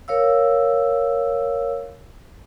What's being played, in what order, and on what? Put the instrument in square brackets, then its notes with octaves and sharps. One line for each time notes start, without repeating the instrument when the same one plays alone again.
[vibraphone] A#4 C#5 F5 E6